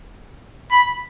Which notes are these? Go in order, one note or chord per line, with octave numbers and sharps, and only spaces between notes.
B5